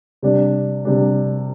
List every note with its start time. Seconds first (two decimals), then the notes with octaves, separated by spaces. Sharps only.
0.22 C3 G3 D4
0.85 C3 G3 D4